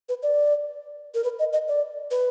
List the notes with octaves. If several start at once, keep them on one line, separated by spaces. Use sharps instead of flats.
B4
D5
A#4
B4
D#5
D#5
D5
B4